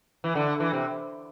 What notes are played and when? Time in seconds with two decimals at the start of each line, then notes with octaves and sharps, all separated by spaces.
0.24 E3
0.35 D3
0.60 E3
0.73 C3